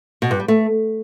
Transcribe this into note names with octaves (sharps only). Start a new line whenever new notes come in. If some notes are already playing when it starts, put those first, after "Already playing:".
B2
G2
G3
A3